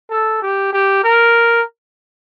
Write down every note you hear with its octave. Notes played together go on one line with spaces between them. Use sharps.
A4
G4
G4
A#4